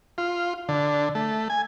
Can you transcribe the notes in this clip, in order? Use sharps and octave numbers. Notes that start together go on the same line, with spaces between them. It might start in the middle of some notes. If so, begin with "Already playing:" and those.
F4
D3
A3
G#5